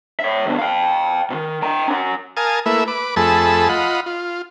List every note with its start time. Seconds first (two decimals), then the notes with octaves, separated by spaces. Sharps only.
0.20 C#5 E5
0.46 D2 B2
0.59 F5 G5
1.30 B2 D#3
1.62 G5 A#5
1.88 C#4 F#5
2.37 A#4 F5 G#5 A5 D#6
2.66 A3 A#3 E4 B4 E5
2.88 B4 D6
3.16 F2 A3 G#4 A5 B5 E6
3.69 F4 D#5 F#5 B5
4.06 F4